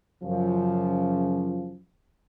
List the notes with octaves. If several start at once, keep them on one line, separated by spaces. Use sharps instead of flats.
F#2 C#3 F3